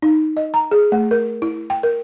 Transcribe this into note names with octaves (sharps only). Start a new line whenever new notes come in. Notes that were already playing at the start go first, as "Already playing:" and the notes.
D#4
D#5
A#5
G#4
A3
A#4
E4
G5
A#4